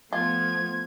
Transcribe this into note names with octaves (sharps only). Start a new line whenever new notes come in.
F3 A3 B3 F4 C6 G#6